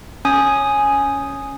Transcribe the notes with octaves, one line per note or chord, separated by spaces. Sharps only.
C#4 G#5 D#6